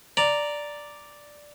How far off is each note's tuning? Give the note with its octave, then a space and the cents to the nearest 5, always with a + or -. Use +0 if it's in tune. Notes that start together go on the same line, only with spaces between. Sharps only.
D5 +0 A#5 +0